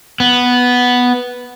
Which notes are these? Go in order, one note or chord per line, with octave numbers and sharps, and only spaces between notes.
B3